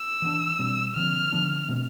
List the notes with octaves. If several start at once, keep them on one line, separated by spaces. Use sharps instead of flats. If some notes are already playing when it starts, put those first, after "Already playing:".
Already playing: E6
E3 B3 D4
B2 G3 C4
D3 F3 C4 F6
D3 F3 B3 D4
B2 A3 C4